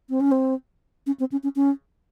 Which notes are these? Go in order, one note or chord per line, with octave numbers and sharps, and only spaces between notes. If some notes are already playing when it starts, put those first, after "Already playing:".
C4
C#4
C4
C#4
C4
C#4
C#4
C#4